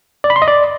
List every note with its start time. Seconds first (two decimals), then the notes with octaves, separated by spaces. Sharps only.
0.24 D5
0.30 B5
0.36 C6
0.42 D#5
0.48 D5